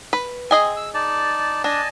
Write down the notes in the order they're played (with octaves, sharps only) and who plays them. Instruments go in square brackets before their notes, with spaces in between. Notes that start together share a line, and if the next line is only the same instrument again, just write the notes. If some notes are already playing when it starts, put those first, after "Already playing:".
[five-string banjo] B4
[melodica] C4 [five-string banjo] G#4 D#5 G#5
[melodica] E6
D#4 D5 A5
[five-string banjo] D4 [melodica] D#5 G#5 A5